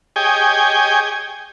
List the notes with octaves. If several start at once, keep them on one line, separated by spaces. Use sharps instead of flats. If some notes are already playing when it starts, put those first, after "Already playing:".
G4 G#4 C#5 D#5 G5 G#5